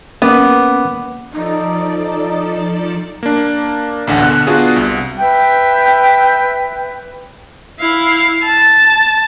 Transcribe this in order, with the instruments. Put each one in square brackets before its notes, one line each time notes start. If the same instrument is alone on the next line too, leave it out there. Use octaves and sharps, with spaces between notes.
[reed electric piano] A#3 C#4 D6 [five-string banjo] B3
[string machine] F3 A4 D5 [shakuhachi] D#4
[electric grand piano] A#3 D4
A1 D2 D3 F#5 G#5
B2 D3 F#6
B3 D4 F4 F#4 G#4
C2
[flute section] B4 E5 G5
[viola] E4 F5
A5